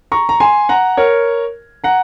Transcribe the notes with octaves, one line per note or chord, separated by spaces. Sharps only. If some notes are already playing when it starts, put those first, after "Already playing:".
A#5 C#6
A#5
G#5 C6
F#5 A#5
A#4 C#5
F#5 A#5